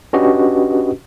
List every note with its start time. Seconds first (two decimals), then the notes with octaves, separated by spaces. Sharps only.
0.13 C#4 D4 F#4 G4 B4 D#5